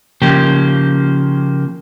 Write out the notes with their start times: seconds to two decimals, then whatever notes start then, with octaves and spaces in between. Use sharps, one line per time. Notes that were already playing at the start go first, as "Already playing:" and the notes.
0.22 C#3 F3 A#3 G4